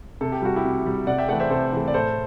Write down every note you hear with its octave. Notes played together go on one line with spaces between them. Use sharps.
C3 A4
G4
G3 F#4
E4 G4
C3
G3
C3 D5 F#5
E5 G5
E3 A3 D5 F#5
C5 E5
C3 A4 C5
E3 A3
D5
A2 A4 C5